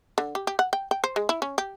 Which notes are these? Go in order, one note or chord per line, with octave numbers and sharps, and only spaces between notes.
D3
G4
G4
F#5
G5
G5
C5
G#3
E4
C#4
G4